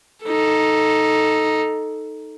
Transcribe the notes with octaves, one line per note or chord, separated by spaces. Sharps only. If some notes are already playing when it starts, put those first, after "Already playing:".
D#4 A4